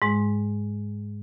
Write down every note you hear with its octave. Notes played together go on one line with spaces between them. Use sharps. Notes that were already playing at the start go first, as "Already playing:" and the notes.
G#2 G#3